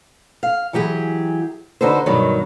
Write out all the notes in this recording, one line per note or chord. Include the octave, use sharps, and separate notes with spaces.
F5
E3 F#3 G4 G#4
D3 D#4 F#4 A4 B4 C5
G2 B2 D#3 F#3